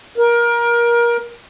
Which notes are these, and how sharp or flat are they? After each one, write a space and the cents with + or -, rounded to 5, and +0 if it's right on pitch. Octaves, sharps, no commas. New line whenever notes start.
A#4 +25